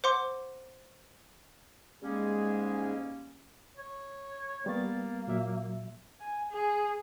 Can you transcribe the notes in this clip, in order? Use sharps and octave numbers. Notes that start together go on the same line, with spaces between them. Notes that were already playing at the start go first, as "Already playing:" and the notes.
C5 F#5 C6 D6
G#2 G3 G#3 A#3 C#4 G#4
C#5
G3 A#3 B3 A6
A#2 F#3 E5
G#5
G#4